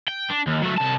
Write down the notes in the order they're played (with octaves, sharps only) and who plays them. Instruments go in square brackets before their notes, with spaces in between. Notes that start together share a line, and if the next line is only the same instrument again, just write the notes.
[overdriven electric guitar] G5
D4
D#2
F#3 A3
C2 A5